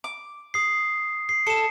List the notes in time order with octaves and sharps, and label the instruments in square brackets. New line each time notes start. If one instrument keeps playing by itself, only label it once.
[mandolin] D6
[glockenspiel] D#6 C7
C7
[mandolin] A4 [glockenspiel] C#7 E7